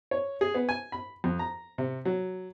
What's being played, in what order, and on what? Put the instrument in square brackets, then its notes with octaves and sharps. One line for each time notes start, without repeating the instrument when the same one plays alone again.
[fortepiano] C#5
G#4
B3
G#5
B5
F2
A#5
C3
F#3